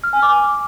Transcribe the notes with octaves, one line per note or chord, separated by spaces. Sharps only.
F6
G#5
D6